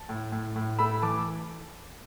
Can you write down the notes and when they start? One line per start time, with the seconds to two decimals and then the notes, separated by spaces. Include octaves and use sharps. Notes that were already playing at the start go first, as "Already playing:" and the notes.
Already playing: A5
0.09 A2
0.32 A2
0.56 A2
0.79 A3 B5 E6
1.02 E3 A5 D6